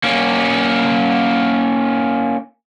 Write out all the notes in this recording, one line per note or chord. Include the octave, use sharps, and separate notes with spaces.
A#3 C#4